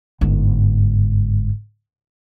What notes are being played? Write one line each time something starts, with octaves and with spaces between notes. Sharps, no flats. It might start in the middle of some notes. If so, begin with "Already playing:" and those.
G1 G#2